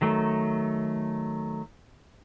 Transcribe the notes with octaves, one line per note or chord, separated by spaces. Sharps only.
D#3 F#3 A3